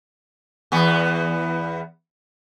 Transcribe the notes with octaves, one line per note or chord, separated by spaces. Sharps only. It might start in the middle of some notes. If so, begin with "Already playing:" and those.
E2 B3